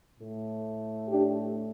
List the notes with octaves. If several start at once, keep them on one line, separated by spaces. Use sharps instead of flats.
A2 A3
D4 G4